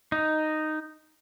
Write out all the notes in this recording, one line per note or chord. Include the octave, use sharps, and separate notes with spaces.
D#4